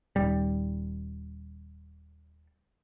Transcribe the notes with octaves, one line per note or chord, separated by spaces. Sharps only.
D#1 G3